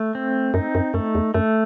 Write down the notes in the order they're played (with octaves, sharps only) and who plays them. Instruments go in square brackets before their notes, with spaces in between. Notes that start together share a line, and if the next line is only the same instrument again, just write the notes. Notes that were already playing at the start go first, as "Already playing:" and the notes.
Already playing: [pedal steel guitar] A3
C4
[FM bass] F#2 [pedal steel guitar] D#4
[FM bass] F#2
[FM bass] F#2 [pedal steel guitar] A3
[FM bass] E2
[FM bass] F#2 [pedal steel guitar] A3